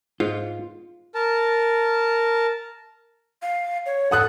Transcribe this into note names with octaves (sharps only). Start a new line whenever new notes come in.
G#2 F4
A#4 A5
F5
C#5
A4 F#5 D#6 F#6